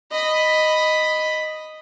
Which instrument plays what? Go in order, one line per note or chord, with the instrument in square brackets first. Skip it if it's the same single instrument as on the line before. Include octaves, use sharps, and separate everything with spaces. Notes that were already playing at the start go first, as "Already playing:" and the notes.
[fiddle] D#5 B5